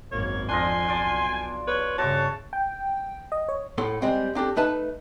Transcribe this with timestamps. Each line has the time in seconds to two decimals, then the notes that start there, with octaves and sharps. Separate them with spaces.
0.12 G#1 F#2 A#3 C#5
0.49 F2 D4 F4 D#5 G#5 C6
0.88 B1 F4 D5 A5
1.67 B4 C#5
1.98 G2 C#3 F#4 C#5 E5 A5 D6
2.53 G5
3.32 D#5
3.49 C#5
3.78 A2 B3 A4 C6
4.02 G3 G#3 C4
4.35 C4 D4 G4 A4
4.56 A3 D#4 B4 E5 A5